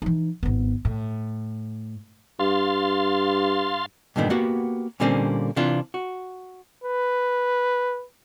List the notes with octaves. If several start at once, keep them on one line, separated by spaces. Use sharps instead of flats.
E3 D#4
G#1 B3
A2
G2 F5 C6 A6
G2 A#2 D3 D#3 B3
A#3 B3 F#4 G4
A#2 D3 G3 A#3 C4 C#4
C3 E3 D4 F4
F#4
B4